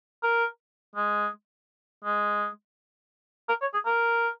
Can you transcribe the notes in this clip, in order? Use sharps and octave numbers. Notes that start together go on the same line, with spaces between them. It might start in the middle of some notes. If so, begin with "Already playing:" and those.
A#4
G#3
G#3
A#4
C#5
G#4
A#4